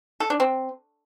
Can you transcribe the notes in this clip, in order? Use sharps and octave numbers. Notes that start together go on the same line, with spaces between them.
A4
D4
C4